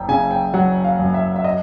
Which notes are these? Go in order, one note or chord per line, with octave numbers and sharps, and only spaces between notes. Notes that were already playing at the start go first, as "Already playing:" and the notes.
Already playing: F#1 G5
C#3 G#5
G5
F#3 F#5
F5
F#2
E5
E5
D#5